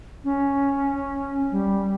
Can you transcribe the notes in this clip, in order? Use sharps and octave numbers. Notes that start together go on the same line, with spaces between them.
C#4
G3